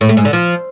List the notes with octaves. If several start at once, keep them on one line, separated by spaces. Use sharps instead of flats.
A2
A3
G#2
D3
F3